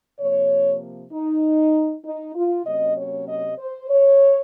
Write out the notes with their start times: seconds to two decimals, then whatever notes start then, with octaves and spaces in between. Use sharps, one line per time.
0.19 C3 F3 A#3 C#5
1.12 D#4
2.04 D#4
2.35 F4
2.66 C3 F#3 A#3 C#4 D#5
2.97 C#5
3.28 D#5
3.58 C5
3.89 C#5